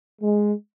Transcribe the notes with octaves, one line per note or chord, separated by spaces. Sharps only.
G#3